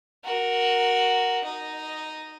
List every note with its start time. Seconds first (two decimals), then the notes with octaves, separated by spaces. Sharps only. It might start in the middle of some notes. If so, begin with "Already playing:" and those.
0.24 F#4 A#4
1.44 D#4 D#5